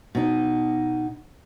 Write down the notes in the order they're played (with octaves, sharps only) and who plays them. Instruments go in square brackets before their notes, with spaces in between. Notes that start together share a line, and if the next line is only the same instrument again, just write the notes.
[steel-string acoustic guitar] B2 D#4